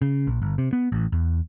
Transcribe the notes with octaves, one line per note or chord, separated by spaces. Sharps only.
C#3
A#1
G1
C3
B3
A1
E2